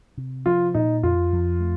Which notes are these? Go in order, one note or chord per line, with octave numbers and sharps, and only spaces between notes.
C3
F3 F4
A#2 D#4
F2 F4
F2
A3